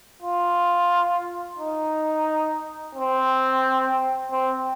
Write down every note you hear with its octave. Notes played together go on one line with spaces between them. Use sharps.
F4
D#4
C4
C4